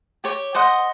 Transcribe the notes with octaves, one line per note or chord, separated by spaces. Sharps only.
G4 C#5
C5 D#5 F#5